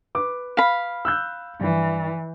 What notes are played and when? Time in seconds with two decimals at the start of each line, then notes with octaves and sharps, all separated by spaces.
0.15 B4 D6
0.57 F5 B5
1.05 E6 F#6 G6
1.61 G2 E3